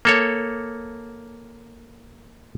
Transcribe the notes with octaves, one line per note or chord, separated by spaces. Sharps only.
A#3 A4 C#5